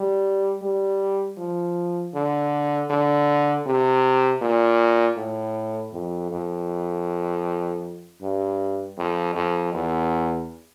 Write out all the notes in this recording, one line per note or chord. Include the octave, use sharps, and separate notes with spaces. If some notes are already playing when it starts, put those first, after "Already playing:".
Already playing: G3
G3
F3
D3
D3
C3
A#2
A2
F2
F2
G2
F2
F2
E2